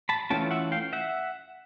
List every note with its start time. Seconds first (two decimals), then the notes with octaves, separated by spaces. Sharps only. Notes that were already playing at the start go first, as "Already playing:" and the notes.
0.09 A5 B5
0.30 E3 A3 C#4 F4 G5 A5
0.51 E5 F#5
0.72 F5 G5
0.93 E5 F#5